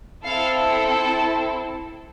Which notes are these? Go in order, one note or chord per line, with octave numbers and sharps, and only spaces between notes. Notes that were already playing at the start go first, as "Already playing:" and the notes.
C4 E4 A4 F5
A5